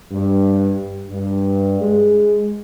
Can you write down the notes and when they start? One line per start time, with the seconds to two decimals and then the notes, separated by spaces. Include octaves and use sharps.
0.12 G2
1.12 G2
1.81 G#3